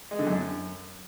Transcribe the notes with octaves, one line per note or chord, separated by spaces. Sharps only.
G#3
D3
F#2